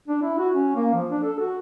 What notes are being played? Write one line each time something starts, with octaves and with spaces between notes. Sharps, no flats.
D4
E4
F#4
C#4
A#3
F3
D4
A4
F#4